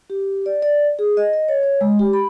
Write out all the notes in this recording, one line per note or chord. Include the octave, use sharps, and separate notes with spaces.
G4
D5
D5
G#4
D#5
D#5
C#5
C#5
G#3
G4
B5